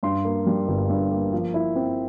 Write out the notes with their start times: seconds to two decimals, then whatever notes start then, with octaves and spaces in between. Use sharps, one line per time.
0.03 G2 C6
0.25 A#3
0.46 G3
0.68 G1
0.89 G2
1.11 A#3
1.33 F3
1.54 E4
1.75 C4